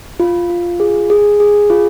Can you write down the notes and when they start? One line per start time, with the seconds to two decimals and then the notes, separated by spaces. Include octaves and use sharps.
0.20 F4
0.50 F4
0.80 G#4
1.10 G#4
1.40 G#4
1.70 F4